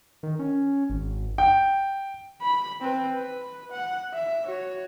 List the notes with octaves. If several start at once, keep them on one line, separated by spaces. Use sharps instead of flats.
D#3
C#4
G#1
G5
B5
C4 B4
B4
F#5
E5
F#4 C#5